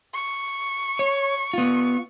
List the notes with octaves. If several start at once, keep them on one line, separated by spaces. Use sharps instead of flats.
C#6
C#5
B3 F4